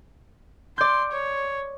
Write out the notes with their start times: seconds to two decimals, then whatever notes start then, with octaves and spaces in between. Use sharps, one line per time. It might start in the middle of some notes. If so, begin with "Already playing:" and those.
0.78 D5 C6 G6
1.12 C#5